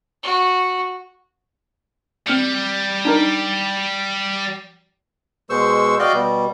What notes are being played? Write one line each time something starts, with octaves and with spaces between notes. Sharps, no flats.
F#4
G3 C4 F6 C#7
D4 D#4 A#4
B2 G#3 C5 C#6 E6
F#4 D5 D#5 F5 G5
B2 G3